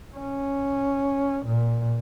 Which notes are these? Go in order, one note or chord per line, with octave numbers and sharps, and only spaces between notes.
C#4
A#2